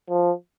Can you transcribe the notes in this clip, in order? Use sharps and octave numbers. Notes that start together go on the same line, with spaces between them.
F3